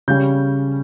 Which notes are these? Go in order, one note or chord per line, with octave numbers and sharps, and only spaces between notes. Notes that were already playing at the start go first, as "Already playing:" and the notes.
C#3 G3 C#4 G6